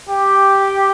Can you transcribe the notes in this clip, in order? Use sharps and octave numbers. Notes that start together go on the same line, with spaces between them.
G4